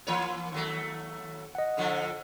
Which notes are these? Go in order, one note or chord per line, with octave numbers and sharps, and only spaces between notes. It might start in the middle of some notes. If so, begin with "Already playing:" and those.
E3 A#3 C#5
D#2 F#3 A3
D#5 F#5
A2 D3 F3